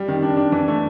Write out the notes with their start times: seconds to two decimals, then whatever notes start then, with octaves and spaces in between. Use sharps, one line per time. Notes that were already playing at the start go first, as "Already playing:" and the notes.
Already playing: G3
0.08 D#3
0.23 D4
0.37 D4
0.52 E3
0.68 A3